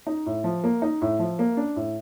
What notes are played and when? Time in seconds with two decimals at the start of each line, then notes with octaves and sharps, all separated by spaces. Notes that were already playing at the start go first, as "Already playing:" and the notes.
0.07 D#4
0.26 A2
0.44 F3
0.64 A#3
0.82 D#4
1.02 A2
1.19 F3
1.39 A#3
1.57 D4
1.76 A2